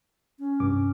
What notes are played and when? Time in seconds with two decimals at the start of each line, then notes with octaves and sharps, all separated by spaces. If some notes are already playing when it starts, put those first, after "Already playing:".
0.39 C#4
0.60 C2 G2 D6